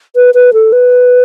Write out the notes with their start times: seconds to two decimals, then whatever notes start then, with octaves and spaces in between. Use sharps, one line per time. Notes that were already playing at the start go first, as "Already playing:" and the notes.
0.16 B4
0.34 B4
0.53 A4
0.72 B4